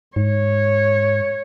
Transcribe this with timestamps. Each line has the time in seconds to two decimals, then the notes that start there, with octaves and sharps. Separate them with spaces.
0.16 G#2 C#5